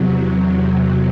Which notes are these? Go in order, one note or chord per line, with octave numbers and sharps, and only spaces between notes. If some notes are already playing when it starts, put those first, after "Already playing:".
Already playing: E2 C3 F#3